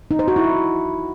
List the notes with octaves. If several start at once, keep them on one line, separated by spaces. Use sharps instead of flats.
D#4
C5
F#4
E4